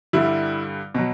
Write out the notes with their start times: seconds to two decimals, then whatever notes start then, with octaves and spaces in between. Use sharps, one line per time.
0.13 G2 D3 G3 E4
0.95 B2 F#3